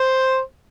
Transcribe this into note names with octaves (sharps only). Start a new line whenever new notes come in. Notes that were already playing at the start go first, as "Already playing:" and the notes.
Already playing: C5